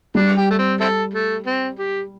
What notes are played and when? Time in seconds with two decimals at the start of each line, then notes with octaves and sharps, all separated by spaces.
0.15 G3 D4
0.37 G4
0.50 A3
0.58 C4
0.81 C4 E4 A4
1.14 A3
1.46 C4
1.78 G4